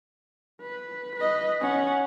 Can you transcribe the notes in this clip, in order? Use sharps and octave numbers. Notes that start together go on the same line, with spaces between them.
B4
B4 D#5
C#4 F#5